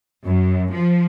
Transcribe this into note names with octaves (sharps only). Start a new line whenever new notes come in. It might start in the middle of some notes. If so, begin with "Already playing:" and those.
F#2
F3